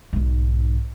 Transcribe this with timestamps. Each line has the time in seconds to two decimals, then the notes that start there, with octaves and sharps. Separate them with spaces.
0.13 B1 G#2